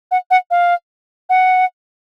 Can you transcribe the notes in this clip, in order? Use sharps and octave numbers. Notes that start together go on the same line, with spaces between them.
F#5
F#5
F5
F#5